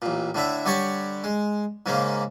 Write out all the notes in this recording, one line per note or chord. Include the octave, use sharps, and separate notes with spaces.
A1 A#2
A2 D3 E4 E5
D3 G3 G4 C#5 D5 C#6
G#3
G#2 C#3 G#3 A#3